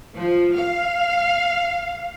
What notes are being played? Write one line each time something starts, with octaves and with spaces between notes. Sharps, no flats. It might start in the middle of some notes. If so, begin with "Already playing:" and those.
F3
F5